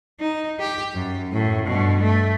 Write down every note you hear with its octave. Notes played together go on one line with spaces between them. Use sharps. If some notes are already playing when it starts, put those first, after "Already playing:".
D#4
G4
F#2
F#2 A2
G2 B2
A3